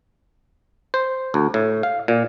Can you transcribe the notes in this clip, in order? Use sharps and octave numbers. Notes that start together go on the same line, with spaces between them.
C5
D2
A2
F5
A#2